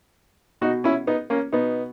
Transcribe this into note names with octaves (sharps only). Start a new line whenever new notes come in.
B2 D#4 F#4
C#4 E4
B3 D#4
A#3 C#4
B2 B3 D#4